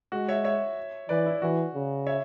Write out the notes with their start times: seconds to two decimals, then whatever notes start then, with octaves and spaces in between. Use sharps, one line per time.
0.12 G#3 F#4
0.28 C#5 E5
0.44 C#5 E5
1.09 E3 B4 D5
1.26 E4
1.42 E3 F#4
1.75 C#3
2.07 C#5 E5